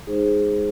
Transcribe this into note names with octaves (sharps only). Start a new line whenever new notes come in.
G#3 D#4 G#4 C5